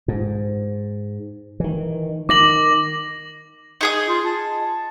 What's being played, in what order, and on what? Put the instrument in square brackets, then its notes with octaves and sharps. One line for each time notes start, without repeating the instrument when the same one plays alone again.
[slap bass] G#2
D#3 E3
[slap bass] D#3 [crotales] D6 A#6 F#7
[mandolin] D#4 G#4 D#6
[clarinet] F4
A5